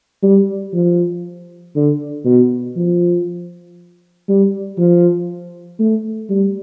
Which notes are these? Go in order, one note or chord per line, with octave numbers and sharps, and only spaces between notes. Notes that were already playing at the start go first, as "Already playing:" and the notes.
G3
F3
D3
B2
F3
G3
F3
A3
G3